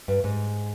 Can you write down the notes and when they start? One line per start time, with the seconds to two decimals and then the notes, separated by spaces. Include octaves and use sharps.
0.08 G2
0.24 G#2